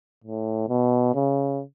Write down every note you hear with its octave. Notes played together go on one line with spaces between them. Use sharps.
A2
B2
C#3